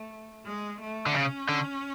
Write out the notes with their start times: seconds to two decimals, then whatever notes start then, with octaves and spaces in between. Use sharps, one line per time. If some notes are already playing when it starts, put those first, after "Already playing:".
Already playing: A3
0.45 G#3
0.81 A3
1.06 D3
1.14 C#3 C#4
1.49 D3